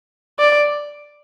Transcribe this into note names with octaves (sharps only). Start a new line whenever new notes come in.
D5